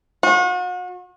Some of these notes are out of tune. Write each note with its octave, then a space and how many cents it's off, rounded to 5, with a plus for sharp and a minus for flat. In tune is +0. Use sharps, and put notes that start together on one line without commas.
F#4 -40